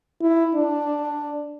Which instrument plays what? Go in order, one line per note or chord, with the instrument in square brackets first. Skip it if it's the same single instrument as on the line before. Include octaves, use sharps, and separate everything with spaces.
[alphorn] E4
D4